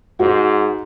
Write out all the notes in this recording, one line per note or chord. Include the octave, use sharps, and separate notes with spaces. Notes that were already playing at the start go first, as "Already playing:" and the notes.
G#2 F#4